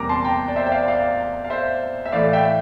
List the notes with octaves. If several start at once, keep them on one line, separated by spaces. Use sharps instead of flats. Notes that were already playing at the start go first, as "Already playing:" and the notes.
Already playing: E2 C3 G3 A#3 A#5 D6
A5 C6
G5 A#5
D5
C5 E5
G5
D5 F5
D5 F5
F5
C5 E5
E5
A2 E3 A3 D5 F5
E5 G5